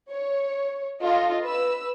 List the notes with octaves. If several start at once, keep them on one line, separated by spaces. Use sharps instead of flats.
C#5
F4 A4 D#5 F5
B4 E6